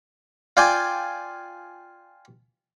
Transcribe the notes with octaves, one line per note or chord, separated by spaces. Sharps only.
F4 D5 G5 G#5